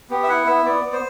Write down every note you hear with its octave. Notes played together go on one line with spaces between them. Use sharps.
B3 G4
E5
E4 F#5
B3 E5
B3 D5
B3
C5